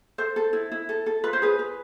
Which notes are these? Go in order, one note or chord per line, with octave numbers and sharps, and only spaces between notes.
A4 C5
A4
E4
E4
A4
A4
F4 B4
C5
G#4 B4
B4